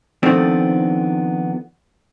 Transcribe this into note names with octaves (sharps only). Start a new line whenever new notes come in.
D#3 F3 A3 B3 C4 D4